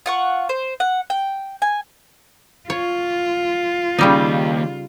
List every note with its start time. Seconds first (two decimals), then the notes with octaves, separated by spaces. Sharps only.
0.06 F4 F#5 C#6
0.49 C5
0.80 F#5
1.10 G5
1.62 G#5
2.70 F4 C#5
3.99 D#2 C#3 G3 D#4 G4